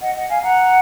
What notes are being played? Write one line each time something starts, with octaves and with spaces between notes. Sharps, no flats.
D#5 F#5
D#5 F#5
F5 G#5
F#5 A#5